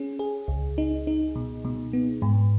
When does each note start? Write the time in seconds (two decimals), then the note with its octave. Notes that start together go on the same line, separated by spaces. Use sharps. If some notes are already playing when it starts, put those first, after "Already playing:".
Already playing: C#4 G#4
0.19 G#4
0.48 C#2
0.78 D#4
1.07 D#4
1.36 B2
1.65 B2
1.93 B3
2.22 G#2